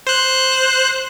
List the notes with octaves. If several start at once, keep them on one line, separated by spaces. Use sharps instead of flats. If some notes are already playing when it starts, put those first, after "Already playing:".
C5 F#6